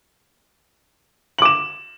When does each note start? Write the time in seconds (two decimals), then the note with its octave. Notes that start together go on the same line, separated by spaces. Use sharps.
1.38 F#7
1.42 D6
1.45 E7